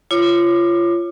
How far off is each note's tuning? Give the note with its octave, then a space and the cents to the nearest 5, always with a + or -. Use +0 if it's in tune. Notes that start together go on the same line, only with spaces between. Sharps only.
F4 -25 C#5 +0 D6 +30